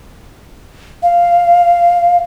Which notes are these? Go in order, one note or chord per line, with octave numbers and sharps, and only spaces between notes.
F5